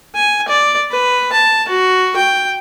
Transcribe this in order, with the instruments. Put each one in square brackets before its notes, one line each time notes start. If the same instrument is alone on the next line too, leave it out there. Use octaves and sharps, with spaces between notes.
[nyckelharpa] G#5
D5
B4
A5
F#4
G5